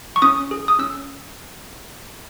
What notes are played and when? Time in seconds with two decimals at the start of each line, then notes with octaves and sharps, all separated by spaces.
0.16 C#6
0.22 C#4 D#6
0.51 G#4
0.68 D#6
0.79 C#4 E6